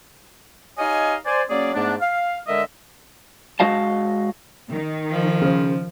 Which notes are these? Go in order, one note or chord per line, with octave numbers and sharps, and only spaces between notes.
D#4 G4 C#5 D#5 F5 G#5
C5 D5 G#5
F#3 A#3 C#4 G#4 D5
G#2 A3 B3 D4
F5
D3 G#3 A#4 D#5 E5
G#3 F#4 D#5 F5 A5
D#3
F3
C#3 C5